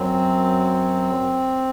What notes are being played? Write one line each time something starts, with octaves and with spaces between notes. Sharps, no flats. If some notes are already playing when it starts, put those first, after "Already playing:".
Already playing: F#2 F#3 C4